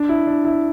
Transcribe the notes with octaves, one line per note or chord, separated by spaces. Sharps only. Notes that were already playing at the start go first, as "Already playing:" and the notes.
Already playing: D4
E4
D4
E4